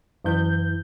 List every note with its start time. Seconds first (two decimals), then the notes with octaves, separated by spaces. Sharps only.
0.24 F#2 E3 G6